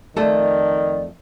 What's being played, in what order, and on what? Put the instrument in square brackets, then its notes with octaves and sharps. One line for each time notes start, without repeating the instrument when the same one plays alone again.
[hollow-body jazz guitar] F2 A3 A4 [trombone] D#3 [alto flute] D5